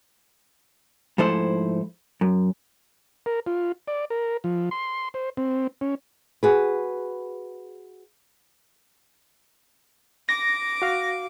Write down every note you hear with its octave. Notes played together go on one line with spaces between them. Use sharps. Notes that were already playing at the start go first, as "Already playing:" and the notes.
G#2 F3 A3 E4 C5
F#2
A#4
F4
D5
A#4
F3
C6
C5
C4
C#4
F#4 G#4 B4
D6 A#6
F#4 F5